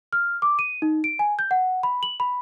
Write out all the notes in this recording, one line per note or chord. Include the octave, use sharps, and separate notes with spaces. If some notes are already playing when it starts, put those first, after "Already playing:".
F6
D6
D#7
D#4
D7
G#5
G6
F#5
B5
F#7
B5